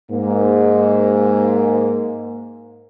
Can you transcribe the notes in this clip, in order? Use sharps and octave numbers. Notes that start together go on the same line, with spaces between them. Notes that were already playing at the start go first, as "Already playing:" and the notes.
G#2 A#3